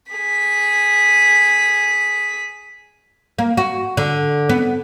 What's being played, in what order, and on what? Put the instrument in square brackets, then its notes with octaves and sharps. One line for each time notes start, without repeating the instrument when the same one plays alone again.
[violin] G#4 B6
[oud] A#3
F#4
D3
B3